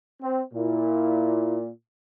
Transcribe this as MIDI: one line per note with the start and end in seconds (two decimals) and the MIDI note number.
0.22 0.41 60
0.54 1.69 46
0.54 1.58 64